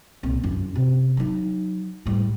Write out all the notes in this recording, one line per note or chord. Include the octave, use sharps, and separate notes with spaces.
C2 A#2
F#2 F4
C3
F#3 D#4
A2 G3